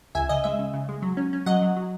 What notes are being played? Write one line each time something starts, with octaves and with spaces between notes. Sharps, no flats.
C#2 E5 G#5
C#3 D#5
G#3 E5
C#3
C#3
G#3
F#3
C#4
C#4
F#3 D#5 F#5
F#3
F#3